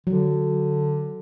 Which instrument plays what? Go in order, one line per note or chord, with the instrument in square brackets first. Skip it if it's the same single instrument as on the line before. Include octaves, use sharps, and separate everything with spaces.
[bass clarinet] D3 [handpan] F#3